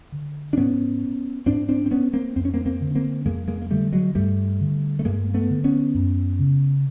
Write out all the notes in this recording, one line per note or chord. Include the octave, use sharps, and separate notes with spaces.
D3
D4
G#2 B3 C#4
G#2 C4 D4
C4 D4
C4
B3 C#4
A#3 C4
F2 C4
C#4
A#3 C4
A#3 C4
D3
A#3 C4
F2 G#3 A#3
G#3 A#3
A#3
D3 G3 A3
F#3 G#3
G2 G3 A3
D3
A3
G2 G#3 A#3
A3 B3
D3
B3 C#4
F#2
C#3